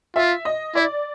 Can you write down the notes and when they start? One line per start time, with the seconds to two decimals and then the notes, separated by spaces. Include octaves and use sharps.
0.16 F4 E5
0.45 D#5
0.75 E4 D5